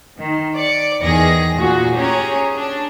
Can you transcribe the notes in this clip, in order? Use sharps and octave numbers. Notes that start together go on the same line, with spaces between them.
D#3
D5 C#7
E2 D#3 G#4 A#6
A#2 F#4 G#4
C#4 G4 G#4 C#5 A#5
D4